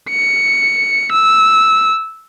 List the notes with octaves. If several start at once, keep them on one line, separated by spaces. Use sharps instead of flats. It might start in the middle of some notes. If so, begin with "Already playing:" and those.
C#7
E6